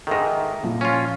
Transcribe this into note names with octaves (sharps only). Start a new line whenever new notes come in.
G#2 D#3 A4 E5 A#6
A#2 F3 E4
C#4 F4